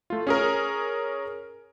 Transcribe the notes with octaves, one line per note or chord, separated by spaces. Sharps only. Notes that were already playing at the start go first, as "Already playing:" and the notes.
A3 F4
C#4 G#4 A#4